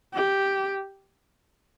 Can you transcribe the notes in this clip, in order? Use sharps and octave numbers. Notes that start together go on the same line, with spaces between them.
G4